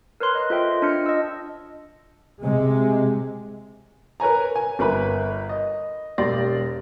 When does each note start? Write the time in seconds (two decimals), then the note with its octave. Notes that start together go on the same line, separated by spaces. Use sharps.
0.20 A#4 B4 C#5 C6 F#6
0.35 D#5
0.50 F4 A4 C5 D#5 E5 G5
0.71 D#5
0.82 D4 F4 F6 G6 C#7
1.06 D#5 E6
2.42 C3 G#3
4.20 A#4 B4 C#5 G#5 A#5
4.56 G#5
4.79 G1 A#4 B4 B5
5.49 D#5
6.18 E1 G4 D5 C6 A#6